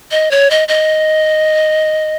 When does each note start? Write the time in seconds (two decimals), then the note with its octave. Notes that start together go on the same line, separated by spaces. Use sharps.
0.11 D#5
0.31 C#5
0.50 D#5
0.68 D#5